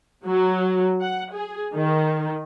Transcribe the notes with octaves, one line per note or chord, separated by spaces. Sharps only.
F#3
F#5
G#4
D#3